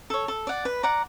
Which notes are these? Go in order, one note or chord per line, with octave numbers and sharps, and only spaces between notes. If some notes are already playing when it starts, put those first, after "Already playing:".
A4 C#5
A4
D5 F#5
B4
D5 F#5 A#5